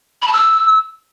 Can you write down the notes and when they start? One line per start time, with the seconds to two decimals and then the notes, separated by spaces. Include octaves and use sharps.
0.22 B5
0.27 A5
0.33 E6